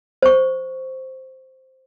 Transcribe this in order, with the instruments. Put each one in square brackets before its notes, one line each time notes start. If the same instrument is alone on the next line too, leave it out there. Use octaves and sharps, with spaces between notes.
[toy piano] C5 C#6